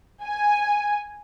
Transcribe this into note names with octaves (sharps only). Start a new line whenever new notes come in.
G#5